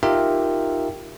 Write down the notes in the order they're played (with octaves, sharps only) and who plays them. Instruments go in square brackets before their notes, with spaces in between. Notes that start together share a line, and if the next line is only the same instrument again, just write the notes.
[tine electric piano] D#4 F4 G4 A#4 E5 G5